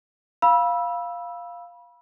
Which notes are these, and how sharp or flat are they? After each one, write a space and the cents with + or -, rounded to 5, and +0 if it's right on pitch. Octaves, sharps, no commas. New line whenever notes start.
F5 +0 B5 -25 E6 +0